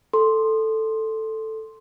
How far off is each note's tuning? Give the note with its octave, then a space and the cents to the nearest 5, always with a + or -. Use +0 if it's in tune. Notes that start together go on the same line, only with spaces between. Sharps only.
A4 +0 C6 +5